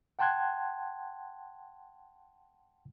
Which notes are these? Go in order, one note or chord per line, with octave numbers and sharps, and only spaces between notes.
F#5 G5 A5 C6 F#6 G#6